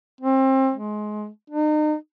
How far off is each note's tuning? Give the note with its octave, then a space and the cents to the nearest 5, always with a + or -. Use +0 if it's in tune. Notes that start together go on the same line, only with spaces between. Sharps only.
C4 +30
G#3 +25
D#4 -35